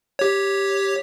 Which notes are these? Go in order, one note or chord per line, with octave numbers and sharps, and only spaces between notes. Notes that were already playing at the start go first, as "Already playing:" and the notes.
G4 C#5